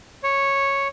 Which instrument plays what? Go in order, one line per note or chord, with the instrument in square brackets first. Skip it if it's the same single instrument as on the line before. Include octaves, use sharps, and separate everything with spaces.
[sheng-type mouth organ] C#5